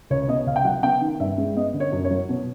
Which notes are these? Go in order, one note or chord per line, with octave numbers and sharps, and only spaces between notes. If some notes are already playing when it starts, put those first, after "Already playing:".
C#2 C#5
B2 D#5
C#2 F5
G5
F#3 F#5
B3 G5
D#3
G2 E5
G#3
B3 D#5
D3
C#5
F#2
C#5
F#3
B2